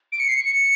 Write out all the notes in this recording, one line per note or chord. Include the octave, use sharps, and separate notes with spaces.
D7
C#7
C7
C#7